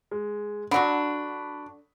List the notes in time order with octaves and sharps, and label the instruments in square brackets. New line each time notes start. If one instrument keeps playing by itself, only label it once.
[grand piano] G#3
[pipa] D3 F#3 [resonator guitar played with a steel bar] D4 F#4 [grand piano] B5